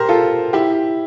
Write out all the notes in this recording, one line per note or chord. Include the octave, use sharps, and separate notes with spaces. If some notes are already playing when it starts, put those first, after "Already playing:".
Already playing: G4 A#4 C5
F4 A4
E4 G4